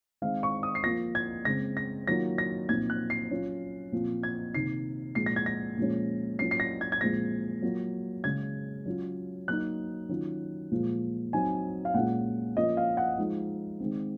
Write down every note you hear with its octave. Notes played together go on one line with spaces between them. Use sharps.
D#3 G#3 C4 D#4 F5
C#6
D#6
C7
F3 A#3 F4 A#6
G#6
C#3 G#3 C4 A#6
A#6
D#3 F#3 A#3 F4 A#6
A#6
A#2 F3 C4 D#4 G#6
F#6
C7
F#3 C#4 F4
A#2 F3 C4
G#6
C3 D#3 A#3 D#4 C7
A#2 F3 G#3 C7
A#6
G#6
A#6
A#2 F3 G#3 C#4
F#3 A#3 C#4 F4 C7
C7
A#6
G#6
G#6
A#2 F3 G#3 C4 A#6
F#3 A#3 F4
C#3 G#3 C#4 G#6
F#3 C#4 F4
F#3 A#3 D#4 F#6
D#3 F#3 C#4 F4
A#2 F3 G#3
F#3 C4 D#4 G#5
F5
A#2 G#3 C#4 F4 F#5
F3 A#3 C#4 F4 D#5
F5
F#5
F3 G#3 D#4
D#3 G#3 C4